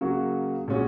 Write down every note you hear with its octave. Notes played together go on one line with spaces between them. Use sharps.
C#3 F#3 A#3 F#4
A#2 G#3 C#4 F#4